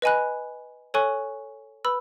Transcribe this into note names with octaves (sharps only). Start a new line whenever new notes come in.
B4 D#5 G#5 B5 F#6
A4 C#5 G#5 C#6 F#6
B4 B5 E6